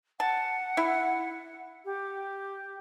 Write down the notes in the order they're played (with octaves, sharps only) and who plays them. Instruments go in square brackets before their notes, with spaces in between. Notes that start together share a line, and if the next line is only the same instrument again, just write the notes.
[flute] F#5 [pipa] A5
[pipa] E4
[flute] G4